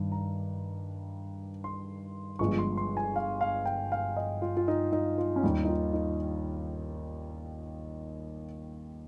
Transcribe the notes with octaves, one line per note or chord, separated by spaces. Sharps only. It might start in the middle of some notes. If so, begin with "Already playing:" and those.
Already playing: G2 D#3 G3
A#5
C6
G1 G2 F3 G#3 C#6
C6
C6
G#5
F5
F5
G5
F5
D#5
F4
F4
D#4
D#4
F4
C#4
D#2 D#3 G3 D#4
D#4
F4
D#4